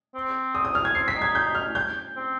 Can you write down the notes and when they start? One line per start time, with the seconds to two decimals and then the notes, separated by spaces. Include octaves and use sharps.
0.15 C4
0.55 D#6
0.65 D#6
0.75 F6
0.85 G#6
0.95 C4 C7
1.08 B6
1.16 D#4
1.22 G#6
1.35 G6
1.55 F6
1.75 G6
2.16 C4